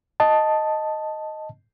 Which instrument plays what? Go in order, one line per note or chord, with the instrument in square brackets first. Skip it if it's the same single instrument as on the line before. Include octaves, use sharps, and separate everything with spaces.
[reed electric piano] D#5 A5